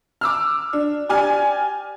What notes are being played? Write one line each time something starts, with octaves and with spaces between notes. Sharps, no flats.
D6 E6 F6
D4
G4 D5 G#5 F6